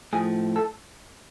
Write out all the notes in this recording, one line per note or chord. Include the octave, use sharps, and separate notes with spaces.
A2 F3 G#4
A4